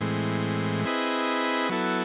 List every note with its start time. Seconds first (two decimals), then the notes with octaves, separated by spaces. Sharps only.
0.01 A2 E3 G#3 C4
0.85 C4 E4 G#4 B4 D#5
1.69 F#3 B3 E4 A4